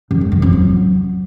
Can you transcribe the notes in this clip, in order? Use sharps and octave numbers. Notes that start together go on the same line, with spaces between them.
F#2
G#3
F#2
F2
F#3